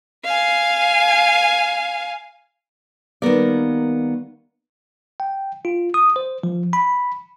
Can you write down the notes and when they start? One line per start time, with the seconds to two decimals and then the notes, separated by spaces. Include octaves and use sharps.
0.24 F5 G#5
3.22 D#3 G3 A#3 B3 A#4 D5
5.20 G5
5.65 F4
5.94 D#6
6.16 C5
6.43 F3
6.73 B5